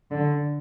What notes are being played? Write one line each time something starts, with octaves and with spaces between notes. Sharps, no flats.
D3